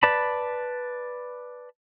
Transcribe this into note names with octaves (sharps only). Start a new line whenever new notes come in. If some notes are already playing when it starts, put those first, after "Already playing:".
B4 D5 A5 B5